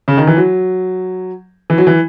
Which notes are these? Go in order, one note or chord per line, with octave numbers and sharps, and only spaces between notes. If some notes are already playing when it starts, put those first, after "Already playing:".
C#3
D#3
E3
F#3
E3
F#3
E3